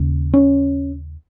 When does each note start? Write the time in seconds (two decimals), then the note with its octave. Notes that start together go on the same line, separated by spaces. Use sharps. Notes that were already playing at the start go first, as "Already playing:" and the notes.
Already playing: D#2 C#3
0.34 C#4